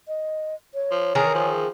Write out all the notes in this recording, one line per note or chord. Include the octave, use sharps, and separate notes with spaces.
D#5
C#5
F3
D#3 E3 G#4 A#4
F3